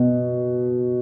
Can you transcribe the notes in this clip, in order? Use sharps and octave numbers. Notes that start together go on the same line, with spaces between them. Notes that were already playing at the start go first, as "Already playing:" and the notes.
Already playing: B2